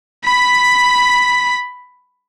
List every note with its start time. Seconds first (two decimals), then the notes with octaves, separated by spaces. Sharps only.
0.24 B5 B6